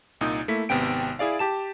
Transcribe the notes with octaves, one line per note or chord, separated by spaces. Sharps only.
C2 A#2 D#4 D#6
A3 A#3 E4 B6
G#1 C3 B3 G5 D7
E4 G#4 D5 F5
G4 A5 E7